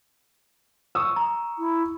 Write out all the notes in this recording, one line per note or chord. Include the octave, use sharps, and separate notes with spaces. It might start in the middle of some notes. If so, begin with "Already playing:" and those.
C#6 D#6 E6
A#5
E4